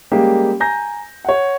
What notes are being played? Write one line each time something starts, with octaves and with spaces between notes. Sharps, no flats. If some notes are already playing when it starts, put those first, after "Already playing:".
G3 G#3 A#3 C#4 G4 G#4
G#5 A#5 G6 A#6
C#5 F#5